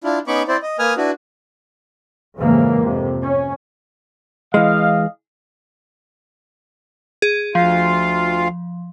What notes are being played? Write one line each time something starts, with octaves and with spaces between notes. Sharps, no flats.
D4 E4 F4
B3 C#4 D#4 B5 C#6 D6
C4 E4 C5 D5
D#5
A#3 B4 G#5 D#6 F6
D4 E4 F#4 B4
F2 G#2 C#3 E3 A#3
F2 C3
C#4
E3 G#3 D#5 F5
G#4
D2 F3 F4 F5